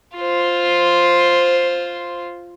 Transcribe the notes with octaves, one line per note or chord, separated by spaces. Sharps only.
F4 C5